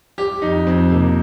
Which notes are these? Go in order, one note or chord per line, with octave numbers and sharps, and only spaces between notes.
G3 G4
F2 D#4
F2 C4
C3 A#3